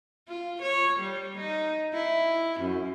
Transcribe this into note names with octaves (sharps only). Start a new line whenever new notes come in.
F4
C#5
G3
D#4
E4
F#2